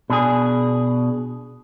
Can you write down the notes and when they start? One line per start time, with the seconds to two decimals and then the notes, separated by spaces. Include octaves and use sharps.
0.10 B2 D4 G#4